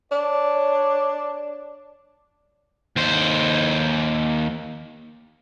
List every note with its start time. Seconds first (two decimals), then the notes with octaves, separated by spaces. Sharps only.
0.12 D4 C#5
2.96 D#2 C5